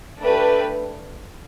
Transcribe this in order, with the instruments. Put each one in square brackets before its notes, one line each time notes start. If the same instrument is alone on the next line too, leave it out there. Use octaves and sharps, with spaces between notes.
[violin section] A3 D4 G4 B4